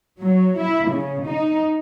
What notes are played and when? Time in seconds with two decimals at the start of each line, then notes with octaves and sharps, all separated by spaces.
0.20 F#3
0.60 E4
0.90 C#3
1.26 D#4